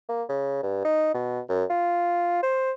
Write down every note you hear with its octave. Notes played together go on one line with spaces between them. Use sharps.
A#3
C#3
G2
D#4
B2
F#2
F4
C5